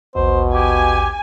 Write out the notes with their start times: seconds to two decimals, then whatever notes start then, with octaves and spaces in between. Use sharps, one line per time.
0.16 A1 D#2 B2 C5
0.54 G4 G#5